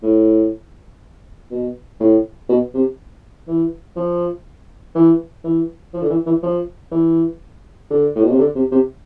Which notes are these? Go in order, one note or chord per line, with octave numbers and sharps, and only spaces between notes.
A2
B2
A2
B2
C3
E3
F3
E3
E3
F3
D3
E3
E3
F3
E3
D3
A2
B2
C3
D3
C3
C3